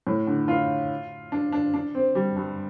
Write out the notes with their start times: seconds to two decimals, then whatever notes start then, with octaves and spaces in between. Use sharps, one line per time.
0.07 A2
0.27 D3
0.48 F4
1.32 D4
1.52 D4
1.74 D4
1.95 C4
2.15 G3
2.36 G2